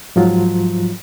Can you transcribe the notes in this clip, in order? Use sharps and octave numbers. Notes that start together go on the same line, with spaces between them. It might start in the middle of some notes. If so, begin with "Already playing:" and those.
G#2 F3 F#3 F4